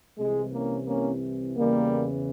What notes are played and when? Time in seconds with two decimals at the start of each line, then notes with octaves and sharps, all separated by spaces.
0.18 C2 C3 E3 G#3
0.52 A#3 C#4
0.87 A#3 C#4
1.56 E2 C#3 E3 G3 A#3